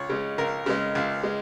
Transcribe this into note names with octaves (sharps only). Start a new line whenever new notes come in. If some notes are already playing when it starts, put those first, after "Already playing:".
Already playing: C#2 C#5
C#3 G#3
C#2 A#4
C#3 G#3
C#2
G#3